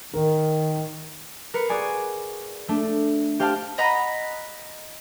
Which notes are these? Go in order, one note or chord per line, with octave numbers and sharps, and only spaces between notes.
D#3 A#4
A#4 B4 C7 C#7
F#4 G#4 D5 G#5
A3 D4
G4 C5 F5 G5 A5 F6
D#5 F#5 A#5 B5